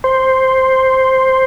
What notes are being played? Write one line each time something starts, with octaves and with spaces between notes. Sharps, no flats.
C5